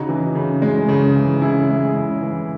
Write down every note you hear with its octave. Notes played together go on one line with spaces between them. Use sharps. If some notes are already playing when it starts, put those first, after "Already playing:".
Already playing: C#3 D#4 F#4
E3
C#3
G#3
C#3
E3
C#3 E4 G#4
G#3
C#3
E3